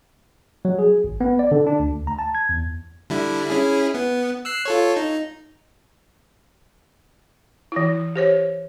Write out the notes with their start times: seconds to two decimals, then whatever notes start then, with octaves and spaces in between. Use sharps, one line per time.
0.65 F#3
0.79 G#4
1.04 G#1
1.21 B3
1.39 D5
1.51 D3
1.67 D4
1.79 D2
2.07 A#5
2.19 A5
2.35 G#6
2.49 E2
3.10 D3 G3 E4
3.50 C#4 E4 G#4
3.94 B3
4.45 E6 F#6 C7
4.65 F4 A4 C#5
4.97 D#4
7.72 E3 E4
8.16 G4 C5 C#5